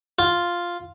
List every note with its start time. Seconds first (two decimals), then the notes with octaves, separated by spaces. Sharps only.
0.19 F4